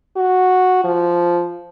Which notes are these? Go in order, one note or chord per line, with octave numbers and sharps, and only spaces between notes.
F#4
F3